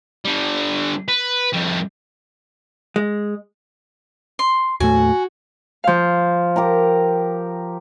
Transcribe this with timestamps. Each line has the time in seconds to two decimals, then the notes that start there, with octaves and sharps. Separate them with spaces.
0.25 D3 G3
1.08 B4
1.53 F2 G3
2.96 G#3
4.39 C6
4.80 D#2 A2 A3 F#4 G#5
5.84 F3 F5
6.56 G4 A#4 A#5